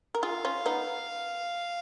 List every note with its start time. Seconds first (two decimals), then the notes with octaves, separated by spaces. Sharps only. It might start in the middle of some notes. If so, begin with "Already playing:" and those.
0.15 A#4
0.23 F4 G#4 F5
0.45 C#4 F4
0.66 B3 D#4